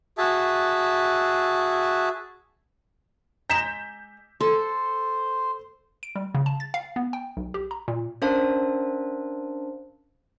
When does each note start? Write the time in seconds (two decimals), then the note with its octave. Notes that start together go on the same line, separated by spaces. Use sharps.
0.18 F#4 G#4 E5 A5
3.50 G#3 D#5 A#5 G6 B6 E7
4.41 A4 C5 C6
6.03 D7
6.15 G3
6.35 C#3
6.46 A5
6.60 A6
6.74 F5
6.96 B3
7.13 G5
7.37 B1
7.54 G4
7.71 A#5
7.88 A#2
8.22 C#4 D4 A#4 C5 F5 A5